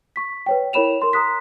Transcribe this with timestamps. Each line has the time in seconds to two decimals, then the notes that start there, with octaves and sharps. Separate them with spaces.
0.16 C#6 B6
0.46 B4 C#5 G5
0.73 E4 A#4 C#5 B5 E7 F7
1.02 A#4 C6
1.13 A#5 C6 D#6 F#6 B6